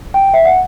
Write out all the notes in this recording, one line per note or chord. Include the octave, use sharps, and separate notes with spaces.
G5
E5
F#5